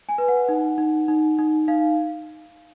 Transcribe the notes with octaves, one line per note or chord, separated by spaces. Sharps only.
G#5
B4
F#5
D#4
D#4
D#4
D#4
D#4 F5